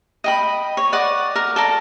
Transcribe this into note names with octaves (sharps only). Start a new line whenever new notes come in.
D#5 G5 B5
C#5
D5 D#5 F#5 D6
A#4
A4 D5 A#5